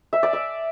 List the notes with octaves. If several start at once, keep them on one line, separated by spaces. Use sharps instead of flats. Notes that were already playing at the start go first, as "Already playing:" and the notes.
E5
D5
E5